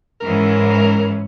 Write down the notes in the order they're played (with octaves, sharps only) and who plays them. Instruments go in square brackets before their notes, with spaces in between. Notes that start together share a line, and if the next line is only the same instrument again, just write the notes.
[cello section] G#2 E3 C#4 [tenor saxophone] A#4